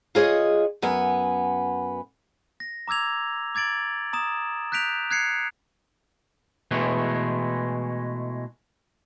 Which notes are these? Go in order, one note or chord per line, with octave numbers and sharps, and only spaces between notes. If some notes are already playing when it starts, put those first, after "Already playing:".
F4 G#4 C#5 D#5
F#2 B3 G#5
A#6
A#5 D6 E6 G#6 F7
D6 G#6 A6 D7 F#7
A#5 D#6 E7
F#6 G6 B6 D7 F7
F#6 G#6 C7 C#7
B2 E3 G#3 A3